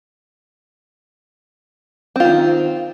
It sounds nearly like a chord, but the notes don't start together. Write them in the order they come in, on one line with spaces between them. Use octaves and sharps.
C4 F4 D#3